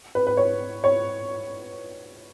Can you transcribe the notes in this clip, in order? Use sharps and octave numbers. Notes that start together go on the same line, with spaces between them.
B4
B4
C#5
C#5